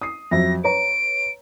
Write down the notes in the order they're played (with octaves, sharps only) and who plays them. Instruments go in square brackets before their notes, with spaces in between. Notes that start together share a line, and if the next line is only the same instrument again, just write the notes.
[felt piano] D#6 C7
[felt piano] F2 F#3 E5 [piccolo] A#6
[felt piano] B4 C#5 A#5 [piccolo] D7